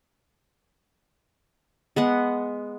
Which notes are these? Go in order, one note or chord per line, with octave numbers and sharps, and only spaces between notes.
G#3 B3 F#5